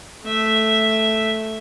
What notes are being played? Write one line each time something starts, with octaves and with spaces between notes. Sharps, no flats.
A3 E5